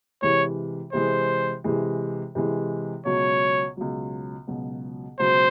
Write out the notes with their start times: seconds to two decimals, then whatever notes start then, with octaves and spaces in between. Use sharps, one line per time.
0.22 C3 E3 G#3 C#5
0.93 C3 E3 G#3 C5
1.64 C3 E3 G#3
2.35 C3 E3 G#3
3.05 C#2 B2 F#3 C#5
3.77 C#2 B2 F#3
4.47 C#2 B2 F#3
5.19 C#2 B2 F#3 C5